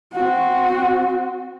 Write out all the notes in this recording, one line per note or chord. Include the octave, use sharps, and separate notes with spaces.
C4 F#4